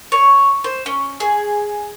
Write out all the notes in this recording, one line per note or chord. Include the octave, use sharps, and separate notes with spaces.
C#5
C5
C#4
G#4